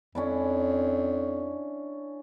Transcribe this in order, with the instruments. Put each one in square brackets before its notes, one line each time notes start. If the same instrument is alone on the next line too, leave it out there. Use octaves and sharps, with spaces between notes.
[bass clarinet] F2 [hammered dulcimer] C#4 D4 E4